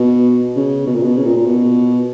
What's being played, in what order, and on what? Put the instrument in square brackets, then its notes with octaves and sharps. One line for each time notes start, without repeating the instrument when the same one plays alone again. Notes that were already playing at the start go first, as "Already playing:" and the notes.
Already playing: [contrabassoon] B2
C#3
B2
A#2
B2
C#3
A#2
A#2
B2